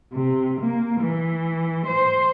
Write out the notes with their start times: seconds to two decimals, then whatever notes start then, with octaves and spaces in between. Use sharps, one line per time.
0.13 C3
0.61 A#3
1.01 E3
1.87 C5